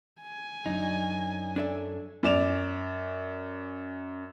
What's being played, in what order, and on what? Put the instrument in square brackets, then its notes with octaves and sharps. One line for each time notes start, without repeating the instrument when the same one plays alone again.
[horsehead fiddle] G#5
[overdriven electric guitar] F#2 [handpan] F#3 D4 [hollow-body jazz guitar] D#4
[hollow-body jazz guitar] D4 A4 E5
[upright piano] F#2 D5 E7 F7